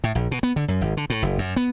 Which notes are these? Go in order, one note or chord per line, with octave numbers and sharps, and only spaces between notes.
A2
A#1
B2
B3
D3
F#2
G#1
D3
A2
F#1
F#2
B3